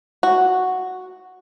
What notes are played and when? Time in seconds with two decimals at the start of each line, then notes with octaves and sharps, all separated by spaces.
0.23 F#4